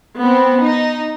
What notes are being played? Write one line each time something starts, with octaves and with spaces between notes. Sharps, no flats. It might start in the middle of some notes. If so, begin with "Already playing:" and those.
B3 C4
D#4